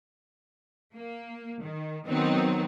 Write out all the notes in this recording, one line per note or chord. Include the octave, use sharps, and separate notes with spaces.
A#3
D#3
D#3 F#3 B3 C4 D#4